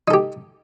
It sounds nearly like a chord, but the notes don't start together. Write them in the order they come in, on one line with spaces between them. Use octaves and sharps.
D#4 A4 G4